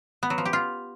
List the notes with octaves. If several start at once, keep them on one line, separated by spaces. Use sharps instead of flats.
B3
F#3
F3
G4
F4